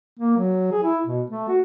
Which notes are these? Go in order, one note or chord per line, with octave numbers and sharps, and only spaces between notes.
A#3
F#3
G#4
E4
B2
A3
F#4